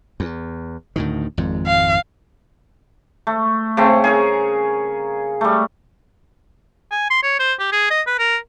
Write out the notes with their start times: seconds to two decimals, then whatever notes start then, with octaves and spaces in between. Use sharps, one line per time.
0.20 E2
0.96 D2 A2 D#3
1.37 G#1 F2 G#2
1.67 F5
3.27 A3
3.77 C#3 A3 C4
4.04 G#4 A#4 C#5
5.41 G3 A3
6.91 G#5
7.10 C6
7.23 C#5
7.40 C5
7.59 G4
7.72 G#4
7.91 D#5
8.07 B4
8.19 A#4